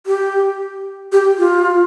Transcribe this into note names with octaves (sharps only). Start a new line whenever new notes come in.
G4
G4
F4